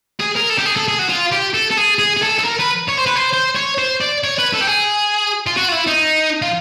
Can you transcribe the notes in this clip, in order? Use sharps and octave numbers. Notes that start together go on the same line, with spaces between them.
G#4
A#4
A4
G4
G#4
A4
G#4
F#4
F4
G4
A4
A4
G#4
G#4
G#4
A4
A4
A#4
B4
C#5
C5
B4
C5
C5
C#5
C5
D5
C#5
B4
A4
G4
G#4
F4
F#4
F4
E4
D#4
F4